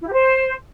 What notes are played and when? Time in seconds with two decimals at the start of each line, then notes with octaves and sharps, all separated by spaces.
0.01 E4
0.07 G4
0.14 C5